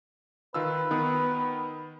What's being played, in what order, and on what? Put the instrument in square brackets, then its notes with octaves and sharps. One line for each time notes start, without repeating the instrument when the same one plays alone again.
[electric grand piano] D#3 F4 E6 [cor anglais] B4
[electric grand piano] D#3 B3 D#6